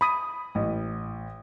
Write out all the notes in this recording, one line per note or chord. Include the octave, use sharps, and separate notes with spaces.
B5 D#6
A1